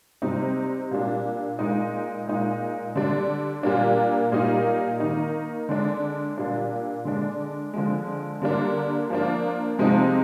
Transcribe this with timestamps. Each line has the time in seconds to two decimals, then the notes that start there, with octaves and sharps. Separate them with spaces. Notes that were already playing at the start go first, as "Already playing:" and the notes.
0.22 C3 G3 C4 D#4
0.91 A#2 G3 D4
1.59 A#2 G#3 D#4
2.27 A#2 G#3 D#4
2.95 D3 G3 D4
3.63 A#2 G3 A#3 D4
4.32 A#2 G3 A#3 D#4
5.00 D#3 A#3 D#4
5.69 D3 G#3 D4
6.38 A#2 G3 D4
7.05 D3 G#3 D4
7.73 D3 F3 G#3
8.42 D3 G3 A#3 D4
9.10 F3 A#3 D4
9.79 C3 F3 G#3 C4 D#4